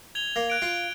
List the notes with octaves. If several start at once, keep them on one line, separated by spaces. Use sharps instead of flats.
G#6 F7 G7
A#3
F#6 D7
F4